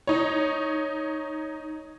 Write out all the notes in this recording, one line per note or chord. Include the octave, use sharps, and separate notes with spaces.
D#4 C#5